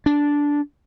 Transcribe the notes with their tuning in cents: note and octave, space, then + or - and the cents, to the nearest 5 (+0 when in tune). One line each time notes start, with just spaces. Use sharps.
D4 -10